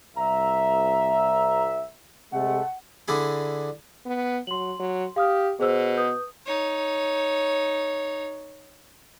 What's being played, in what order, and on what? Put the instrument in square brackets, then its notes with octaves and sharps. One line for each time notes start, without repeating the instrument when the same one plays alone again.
[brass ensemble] C2 E5 [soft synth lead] A#5
[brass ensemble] C3 G#3 A3 [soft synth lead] F#5
[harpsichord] D3 D4 E4 G#4 B5
[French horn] B3
[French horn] F#3 [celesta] C6 F#7
[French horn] F#3
[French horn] G4 [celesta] F5 D#6 F6
[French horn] B2 [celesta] G#4 C5 E6
[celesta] B4 D#6 G6
[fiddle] D#4 C#5